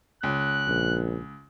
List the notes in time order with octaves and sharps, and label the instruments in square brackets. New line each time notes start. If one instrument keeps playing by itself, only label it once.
[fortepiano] C#2 [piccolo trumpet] F#6
[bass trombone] A#1